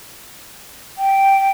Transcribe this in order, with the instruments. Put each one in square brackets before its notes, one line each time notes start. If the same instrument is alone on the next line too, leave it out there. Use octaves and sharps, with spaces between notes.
[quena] G5